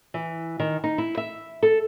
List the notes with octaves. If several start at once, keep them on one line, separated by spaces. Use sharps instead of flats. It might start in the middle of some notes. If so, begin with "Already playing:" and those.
E3
D#3
D#4
E4
E5
A4